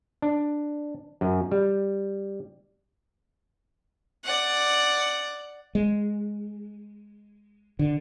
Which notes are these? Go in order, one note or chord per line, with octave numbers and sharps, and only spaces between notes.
D4
F#2
G3
D5 F#5
G#3
D3